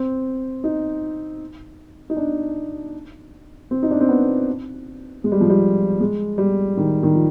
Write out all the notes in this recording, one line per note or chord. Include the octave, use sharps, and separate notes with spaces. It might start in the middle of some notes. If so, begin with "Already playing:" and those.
Already playing: C4
D#4
D#4
D4
C4
D#4
D4
C4
B3
G#3
G3
F3
G3
G#3
G3
D#3
D#3
F3